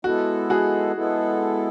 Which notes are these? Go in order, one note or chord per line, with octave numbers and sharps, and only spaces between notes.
G#3 B3 E4 F#4 A4
F#4 G#4
G#3 B3 E4 A4